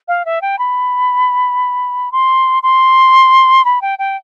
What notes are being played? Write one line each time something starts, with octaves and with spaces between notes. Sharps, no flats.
F5
E5
G5
B5
C6
C6
B5
G5
G5